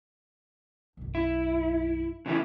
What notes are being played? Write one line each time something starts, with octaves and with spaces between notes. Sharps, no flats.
B1 F#2
E4
C#3 E3 E4